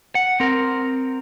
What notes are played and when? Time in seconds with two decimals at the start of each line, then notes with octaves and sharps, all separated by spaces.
0.15 F#5
0.40 C4 A#4